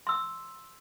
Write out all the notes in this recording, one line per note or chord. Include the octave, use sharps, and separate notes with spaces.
C6 E6